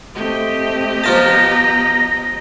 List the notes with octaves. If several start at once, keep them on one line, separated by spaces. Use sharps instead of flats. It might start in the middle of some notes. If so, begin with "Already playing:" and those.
A3 C4 G4 D#5
F3 B3 F4 A5 A#5 A#6